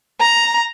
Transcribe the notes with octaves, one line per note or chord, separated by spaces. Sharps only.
A#5